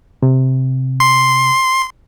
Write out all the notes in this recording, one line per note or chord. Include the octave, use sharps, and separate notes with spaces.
C3
C6